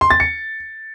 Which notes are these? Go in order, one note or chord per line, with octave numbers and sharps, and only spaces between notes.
C6
A6
C#7